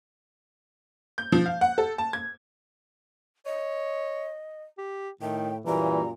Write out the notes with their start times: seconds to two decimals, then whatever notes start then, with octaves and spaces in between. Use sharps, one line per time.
1.18 G6
1.32 F3
1.46 F5
1.61 F#5
1.78 A4
1.98 A5
2.13 G#6
3.46 C#5 D#5
4.78 G4
5.21 A2 D#3 G5
5.66 F#2 A#2 E3 G3 A#5